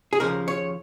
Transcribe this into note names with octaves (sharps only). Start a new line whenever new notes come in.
G#4
D#2 C#3 F3 A#4
C#5